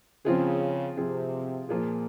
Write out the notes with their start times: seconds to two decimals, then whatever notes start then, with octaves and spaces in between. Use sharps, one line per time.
0.25 C#3 F3 C4 F4 G#4
0.97 C3 F3 C4 F4 G#4
1.68 A#2 F3 A#3 F4 G#4